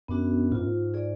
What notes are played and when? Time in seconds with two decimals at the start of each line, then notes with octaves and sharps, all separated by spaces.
0.08 F#2 B3 D4 F#4
0.52 G#2 F4
0.59 F#2
0.66 G#2
0.94 G#4 D5